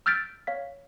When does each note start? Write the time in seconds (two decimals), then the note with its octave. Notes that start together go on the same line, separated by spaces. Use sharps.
0.06 E6 F6 G6 A6 B6 D7
0.47 C#5 F5 B6